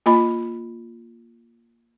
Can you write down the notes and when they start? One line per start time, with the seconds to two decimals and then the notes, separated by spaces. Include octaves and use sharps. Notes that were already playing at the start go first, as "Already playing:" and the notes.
0.06 A#3 F4 D#5 B5